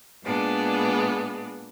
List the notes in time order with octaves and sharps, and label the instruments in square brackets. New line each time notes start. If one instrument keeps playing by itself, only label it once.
[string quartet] A#2 G#3 B3 D4